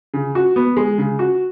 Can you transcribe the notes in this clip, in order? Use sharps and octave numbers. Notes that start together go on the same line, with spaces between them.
C#3
F#4
B3
G#3
C#3
F#4